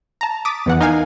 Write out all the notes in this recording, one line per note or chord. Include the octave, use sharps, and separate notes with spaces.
A5 A#5
D6 D#6 A6 B6 D7
E2 E3 F#5
D#4 A#4 F5 G#5